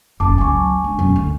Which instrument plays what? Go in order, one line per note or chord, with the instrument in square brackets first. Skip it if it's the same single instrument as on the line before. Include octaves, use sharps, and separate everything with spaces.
[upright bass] F#1 D2 [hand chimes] A5 D6
[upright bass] C#2 F#3 [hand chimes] G#5 C#6
[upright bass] G#3 D4
F#2 B2
D2